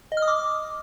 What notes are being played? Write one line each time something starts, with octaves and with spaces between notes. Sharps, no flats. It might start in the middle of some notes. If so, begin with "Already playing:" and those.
D#5
F6
D#6
D6